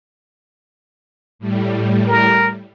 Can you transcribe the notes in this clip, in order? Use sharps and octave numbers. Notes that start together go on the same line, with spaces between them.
A2 G3
A#4